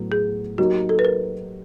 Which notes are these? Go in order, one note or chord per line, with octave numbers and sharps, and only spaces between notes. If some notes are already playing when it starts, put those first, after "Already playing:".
Already playing: A2 F#3 B3
G#4
F#3 A#3 D#4 F#4 G4
A4
B4
A#4